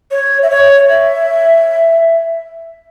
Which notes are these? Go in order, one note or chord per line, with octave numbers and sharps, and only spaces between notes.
C#5
E5
C#5
E5